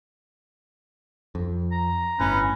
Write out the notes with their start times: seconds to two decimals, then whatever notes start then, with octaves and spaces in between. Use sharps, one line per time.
1.35 F2
1.72 A#5
2.20 G1 A2 C#4 B4